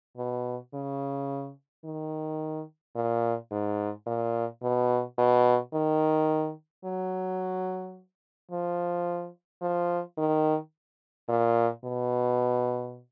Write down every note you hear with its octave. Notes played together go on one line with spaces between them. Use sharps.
B2
C#3
D#3
A#2
G#2
A#2
B2
B2
D#3
F#3
F3
F3
D#3
A#2
B2